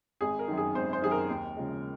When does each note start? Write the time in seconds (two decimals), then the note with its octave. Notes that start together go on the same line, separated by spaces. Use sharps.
0.21 G#1 G#4
0.39 A#4
0.48 F#2 D#3
0.57 G#4
0.75 G#1 C5
0.93 C5
1.02 F#2 D#3 G#4
1.11 A#4
1.30 D#2
1.57 C#3 F3 G#3